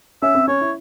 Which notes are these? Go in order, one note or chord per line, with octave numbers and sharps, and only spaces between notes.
C#4 E5
C4
C#4 C#5
E4